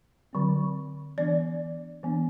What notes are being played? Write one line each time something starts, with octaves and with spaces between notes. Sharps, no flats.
D3 F#3 C4
E3 B3 D4 D5
E3 B3 D4